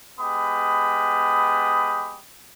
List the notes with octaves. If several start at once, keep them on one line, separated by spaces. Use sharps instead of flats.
G#3 B3 G4 B5 D#6